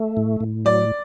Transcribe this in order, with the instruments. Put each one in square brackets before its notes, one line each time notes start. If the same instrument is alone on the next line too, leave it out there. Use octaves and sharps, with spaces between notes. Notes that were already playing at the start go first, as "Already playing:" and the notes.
Already playing: [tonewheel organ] A3
A2
A2
[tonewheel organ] F#3 [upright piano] D5